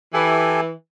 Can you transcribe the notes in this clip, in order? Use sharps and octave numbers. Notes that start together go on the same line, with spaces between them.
E3 G4 A4 G#5